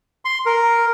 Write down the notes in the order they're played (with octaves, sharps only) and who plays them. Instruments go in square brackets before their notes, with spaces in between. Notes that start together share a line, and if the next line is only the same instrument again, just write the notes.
[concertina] C6
A#4